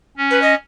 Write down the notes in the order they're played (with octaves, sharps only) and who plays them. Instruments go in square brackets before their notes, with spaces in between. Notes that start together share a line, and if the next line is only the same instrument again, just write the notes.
[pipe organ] C#4
[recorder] B4
D#5